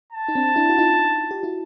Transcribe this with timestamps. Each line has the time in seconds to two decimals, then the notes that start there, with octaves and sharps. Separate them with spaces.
0.13 A5
0.28 D#4
0.35 C4 D4
0.56 D4 E4
0.70 F#4
0.78 D#4 F4
1.31 G4
1.43 E4 F#4